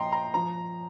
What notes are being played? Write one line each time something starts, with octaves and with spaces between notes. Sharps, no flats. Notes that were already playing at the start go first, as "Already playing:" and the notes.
Already playing: A#2 F3 D#5 G5 A#5 C6
A#5
F3 A#5